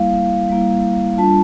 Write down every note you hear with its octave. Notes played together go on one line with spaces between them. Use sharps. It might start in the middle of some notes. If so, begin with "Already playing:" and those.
Already playing: G3 A#3 E4 F5
G3 A#3 E4
G3 D4 F4 A5